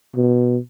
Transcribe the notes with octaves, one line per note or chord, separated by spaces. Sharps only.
B2